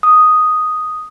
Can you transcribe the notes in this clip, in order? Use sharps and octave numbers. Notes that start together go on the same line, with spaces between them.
D#6